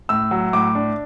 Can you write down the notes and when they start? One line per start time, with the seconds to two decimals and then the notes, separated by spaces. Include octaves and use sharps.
0.09 A2 E6
0.31 F#3
0.53 A2 D6
0.75 D4